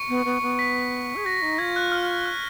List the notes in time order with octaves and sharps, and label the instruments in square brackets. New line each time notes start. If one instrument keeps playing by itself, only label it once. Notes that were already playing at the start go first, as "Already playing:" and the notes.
Already playing: [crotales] C#6 C#7
[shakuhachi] B3
B3
B3
[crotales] B6
[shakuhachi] G#4
[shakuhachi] F#4 [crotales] A#6
[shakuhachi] D#4
[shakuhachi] F4 [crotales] G#6
[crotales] F#6
F6
F#6